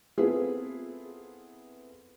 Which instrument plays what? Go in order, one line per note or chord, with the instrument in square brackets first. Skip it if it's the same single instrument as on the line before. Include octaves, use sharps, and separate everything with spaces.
[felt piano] B3 C4 E4 F4 G#4 A4